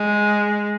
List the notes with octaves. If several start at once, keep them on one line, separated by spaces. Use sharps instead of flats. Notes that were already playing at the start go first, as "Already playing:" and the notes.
Already playing: G#3